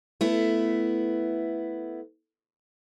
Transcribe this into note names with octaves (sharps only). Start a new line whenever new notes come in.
A3 B3 E4